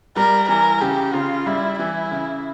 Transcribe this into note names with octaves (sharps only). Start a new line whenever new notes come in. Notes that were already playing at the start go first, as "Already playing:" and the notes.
G3 A#4
E3 A#4
C#3 G4
C#3 F4
G3 E4
E3 E4
C#3